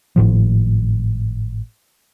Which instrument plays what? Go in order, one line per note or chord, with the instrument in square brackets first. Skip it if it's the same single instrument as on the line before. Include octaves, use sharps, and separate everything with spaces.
[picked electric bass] G#1 A2 F3